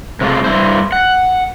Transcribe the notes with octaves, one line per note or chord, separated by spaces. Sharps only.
C3 F#3 G#3 A3 F4
G2 E4 C5
F#5